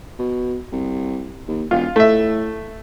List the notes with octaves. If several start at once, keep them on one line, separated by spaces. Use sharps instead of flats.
B2
C2
D#2
E1 F4
A2 A3 E5